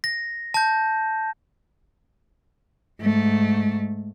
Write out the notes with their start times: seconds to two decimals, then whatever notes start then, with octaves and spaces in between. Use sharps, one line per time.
0.04 A#6
0.54 A5 G6
3.01 G#2 A3